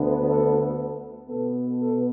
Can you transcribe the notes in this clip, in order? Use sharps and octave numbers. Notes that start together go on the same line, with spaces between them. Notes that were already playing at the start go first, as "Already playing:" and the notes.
Already playing: D2 D3 B3
A4
B2 B3 A4
A4